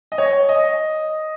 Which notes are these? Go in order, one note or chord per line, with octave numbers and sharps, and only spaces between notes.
D#5
C#5
D#5